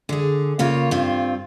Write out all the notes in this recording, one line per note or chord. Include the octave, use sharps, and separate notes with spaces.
D3 G#4
C#3 A#3 F4 C#5
G2 C4 F4